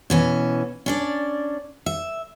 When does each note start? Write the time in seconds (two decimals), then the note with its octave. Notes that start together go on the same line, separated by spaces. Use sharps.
0.10 B2 E3 C#4
0.86 C#4 D4 D5
1.86 E5